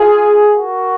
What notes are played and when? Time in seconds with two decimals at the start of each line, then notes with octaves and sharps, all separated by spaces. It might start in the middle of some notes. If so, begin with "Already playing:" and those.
Already playing: F4 G#4
0.52 F#4 A#4